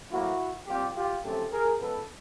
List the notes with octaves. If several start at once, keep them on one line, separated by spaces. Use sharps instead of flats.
A2 F#3 A#3 E4 F#4
A#2 G3 C4 F4 G4
F4 G4
F#2 C#3 F3 A3 C4 G4 A4
G#4 A#4
C#3 F3 G#3 B3 A4 B4